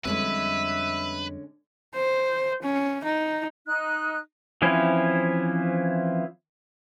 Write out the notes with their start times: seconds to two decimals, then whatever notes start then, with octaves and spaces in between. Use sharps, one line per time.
0.05 F2 D3 G3 G#3 C#4 B4 E5
1.95 C5
2.63 C#4
3.04 D#4
3.67 D#4 F#6
4.62 E3 F3 C4 C#4 E4